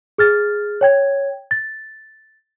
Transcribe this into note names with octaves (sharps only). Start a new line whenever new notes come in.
G#4 F6 A6
C#5 G5 G#6
A6